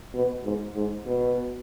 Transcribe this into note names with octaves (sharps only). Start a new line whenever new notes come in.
B2
G#2
G#2
B2